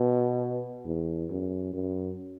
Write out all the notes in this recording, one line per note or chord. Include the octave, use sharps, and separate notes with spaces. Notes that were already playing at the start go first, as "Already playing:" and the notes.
Already playing: B2
E2
F#2
F#2